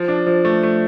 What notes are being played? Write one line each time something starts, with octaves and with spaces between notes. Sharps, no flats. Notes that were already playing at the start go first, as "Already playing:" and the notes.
Already playing: F3
D4
F3
A3
A3